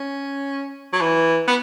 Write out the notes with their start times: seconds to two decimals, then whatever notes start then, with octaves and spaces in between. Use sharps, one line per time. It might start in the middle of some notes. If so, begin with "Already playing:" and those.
Already playing: C#4
0.93 F#3
1.01 E3
1.48 B3